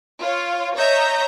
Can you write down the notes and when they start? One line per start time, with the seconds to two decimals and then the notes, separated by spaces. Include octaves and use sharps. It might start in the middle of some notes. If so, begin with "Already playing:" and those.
0.21 F4 C#5
0.77 C#5 D#5 E5 A#5 G6